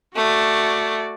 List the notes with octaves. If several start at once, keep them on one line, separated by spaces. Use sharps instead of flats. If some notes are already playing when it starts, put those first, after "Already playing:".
A3 F#4 D5